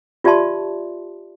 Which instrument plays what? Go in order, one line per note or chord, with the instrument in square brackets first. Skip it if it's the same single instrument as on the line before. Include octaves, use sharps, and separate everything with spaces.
[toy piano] F4 G4 D5 E5 A5 C6